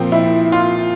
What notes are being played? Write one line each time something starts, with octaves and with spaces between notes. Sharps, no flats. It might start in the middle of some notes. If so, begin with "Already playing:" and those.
Already playing: A#2 F3 C4
E4
F4